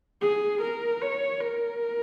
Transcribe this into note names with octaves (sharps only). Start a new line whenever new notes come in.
G#4
A#4
C#5
A#4